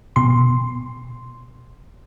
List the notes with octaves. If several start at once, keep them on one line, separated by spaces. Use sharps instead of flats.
B2 C6